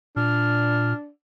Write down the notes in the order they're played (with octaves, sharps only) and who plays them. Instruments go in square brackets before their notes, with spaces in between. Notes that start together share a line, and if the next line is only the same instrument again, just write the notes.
[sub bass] A#2 [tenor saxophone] D4 [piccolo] F6